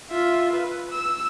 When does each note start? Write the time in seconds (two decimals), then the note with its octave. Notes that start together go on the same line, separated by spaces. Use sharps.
0.10 F4 E5
0.53 B4
0.91 E6